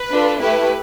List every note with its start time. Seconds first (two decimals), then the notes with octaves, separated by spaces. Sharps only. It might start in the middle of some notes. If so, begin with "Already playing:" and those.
Already playing: B4
0.11 D4 F4 A4
0.40 A3 E4 G4 B4